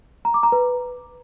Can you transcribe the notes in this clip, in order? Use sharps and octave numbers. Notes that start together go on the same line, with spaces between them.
A#5
D6
A#5
B4